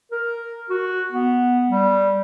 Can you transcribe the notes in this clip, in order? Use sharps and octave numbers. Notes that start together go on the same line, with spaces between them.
A#4
F#4
B3
G3